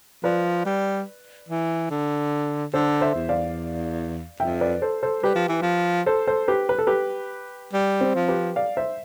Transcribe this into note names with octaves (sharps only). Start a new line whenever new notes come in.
F3 B4 D5
G3
E3
D3
D3 A4 C5
C5 E5
E2
D5 F5
F2 E5 G5
B4 D5
A4 C5
A4 C5
G3 G4 B4
F3
E3
F3
A4 C5
A4 C5
G4 B4
B4
A4
G4 B4
G3
C4
F3
G4 B4
D5 F5
C5 E5